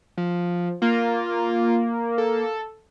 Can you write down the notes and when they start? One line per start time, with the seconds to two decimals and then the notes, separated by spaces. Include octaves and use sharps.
0.18 F3
0.82 A#3 F4
2.18 A4